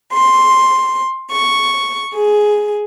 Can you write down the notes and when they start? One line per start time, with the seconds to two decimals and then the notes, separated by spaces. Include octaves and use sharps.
0.11 C6
1.31 C#6
2.13 G#4